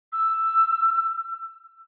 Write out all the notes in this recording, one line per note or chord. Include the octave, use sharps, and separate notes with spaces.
E6